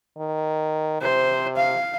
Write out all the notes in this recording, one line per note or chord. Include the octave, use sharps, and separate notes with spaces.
D#3
C3 C5
F5